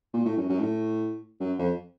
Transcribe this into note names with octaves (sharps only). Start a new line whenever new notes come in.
A#2
A2
F#2
F#2
A2
F#2
F2